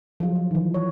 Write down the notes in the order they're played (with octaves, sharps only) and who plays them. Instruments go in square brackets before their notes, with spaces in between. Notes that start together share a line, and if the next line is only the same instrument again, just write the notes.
[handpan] F3 F#3 F4 G#4
F4
D#3 E3
C#5